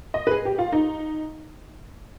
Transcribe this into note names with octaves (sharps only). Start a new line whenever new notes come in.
D#5
B4
G#4
G4
F4
D#4